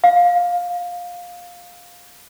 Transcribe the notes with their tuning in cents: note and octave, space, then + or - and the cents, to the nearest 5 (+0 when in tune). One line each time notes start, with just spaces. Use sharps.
F5 +15